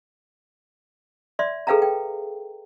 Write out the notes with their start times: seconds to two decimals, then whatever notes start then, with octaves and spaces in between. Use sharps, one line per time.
1.39 D5 E5 C6
1.67 G#4 A4 B4 F5 G5 A#5
1.82 G5